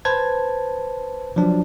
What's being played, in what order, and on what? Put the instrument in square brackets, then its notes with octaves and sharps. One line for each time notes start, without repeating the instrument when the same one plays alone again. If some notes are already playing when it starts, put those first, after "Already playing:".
[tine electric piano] B4 C5 A5 G#6
F3 F#3 D4